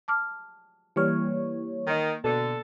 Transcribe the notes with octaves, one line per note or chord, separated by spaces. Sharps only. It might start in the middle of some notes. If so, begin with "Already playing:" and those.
A5 D6 F6
E3 G3 A#3 C#5 F6
D#3
B2 D3 A4